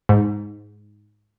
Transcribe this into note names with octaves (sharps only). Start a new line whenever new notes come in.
G#2